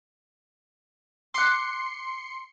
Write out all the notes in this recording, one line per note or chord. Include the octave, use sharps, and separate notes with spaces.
C6 D6 F#6 C7 C#7